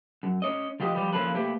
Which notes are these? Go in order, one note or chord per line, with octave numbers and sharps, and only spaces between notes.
F#2
C#4 C#5 D#5
F3 F4 G4 D#5
F3 G3 G4 B4
F3 A#3 C#4 F4 A4 B4
A3 A#3 G4 B4